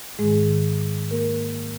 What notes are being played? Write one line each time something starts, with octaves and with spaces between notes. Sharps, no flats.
G#2 D#3 G#3 G#4
A#3 A#4